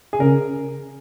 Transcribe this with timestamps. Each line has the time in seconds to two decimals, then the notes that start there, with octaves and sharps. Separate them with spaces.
0.13 G#4
0.20 C#3 A#4